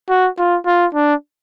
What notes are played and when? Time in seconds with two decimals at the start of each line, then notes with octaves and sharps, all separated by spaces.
0.09 F#4
0.38 F4
0.66 F4
0.94 D4